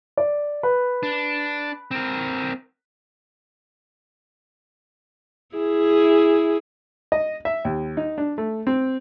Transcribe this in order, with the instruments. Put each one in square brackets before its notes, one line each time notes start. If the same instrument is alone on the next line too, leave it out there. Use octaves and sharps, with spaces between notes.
[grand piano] D5
B4
[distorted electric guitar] D4
C4 A#4
[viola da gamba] E4 G#4
[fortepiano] D#5
E5
D#2
D#4
D4
A3
C4